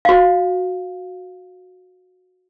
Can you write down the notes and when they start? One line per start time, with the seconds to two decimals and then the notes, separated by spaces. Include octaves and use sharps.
0.05 F#4 F5